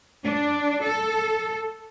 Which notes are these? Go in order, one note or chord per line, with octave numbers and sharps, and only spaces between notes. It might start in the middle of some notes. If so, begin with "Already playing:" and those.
D4
A4